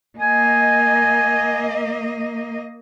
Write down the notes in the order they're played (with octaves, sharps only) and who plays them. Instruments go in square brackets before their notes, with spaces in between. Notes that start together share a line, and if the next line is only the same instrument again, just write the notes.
[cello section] A#3 D#5 [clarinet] G#5